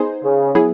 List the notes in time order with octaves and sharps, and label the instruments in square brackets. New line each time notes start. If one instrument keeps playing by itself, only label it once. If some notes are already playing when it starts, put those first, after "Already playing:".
Already playing: [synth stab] B3 D#4 G#4 C5
[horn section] C#3
[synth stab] F#3 B3 E4 G#4